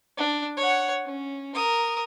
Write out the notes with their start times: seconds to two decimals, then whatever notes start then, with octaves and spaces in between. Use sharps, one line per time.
0.18 D4
0.57 C#5 F#5
1.05 C#4
1.55 A#4 D#6